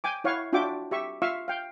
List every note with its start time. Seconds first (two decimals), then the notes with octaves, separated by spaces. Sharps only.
0.04 G5 G#5 D6
0.24 E4 C#5 F5 F#5 C#6
0.53 D4 F4 F#4 E5 G5 D6
0.91 G4 E5 C#6
1.22 F4 E5 F5 C#6 E6
1.48 F5 G5